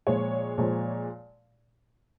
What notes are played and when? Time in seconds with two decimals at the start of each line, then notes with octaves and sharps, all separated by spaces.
0.07 A#2 F3 G#3 C#5
0.58 A#2 F3 G#3